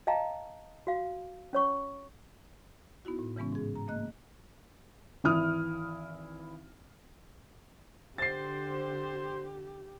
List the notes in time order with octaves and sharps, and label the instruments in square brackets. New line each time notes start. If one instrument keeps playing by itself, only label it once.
[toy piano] D#5 F5 G5 A5 A#5
F#4 F5
C#4 C#5 C#6
[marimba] B3 D#4 E4 F#4
A2
C#3 E3 G#3 B3 C#4
G#2 G#4
A#5
A3 A#3 D#5 F#6
[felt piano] G#1 E3 E4 D#6 F6
[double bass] D3 [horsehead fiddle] G4 [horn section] C5 [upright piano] A6 C7